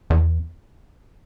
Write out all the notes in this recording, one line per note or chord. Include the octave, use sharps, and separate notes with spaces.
E2